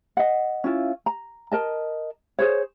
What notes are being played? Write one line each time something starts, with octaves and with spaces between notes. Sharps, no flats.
D#5 F#5
C#4 E4 F4
A#5
A#4 D#5 A5
G#4 C5 C#5